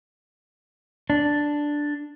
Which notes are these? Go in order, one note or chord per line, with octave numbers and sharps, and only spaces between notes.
D4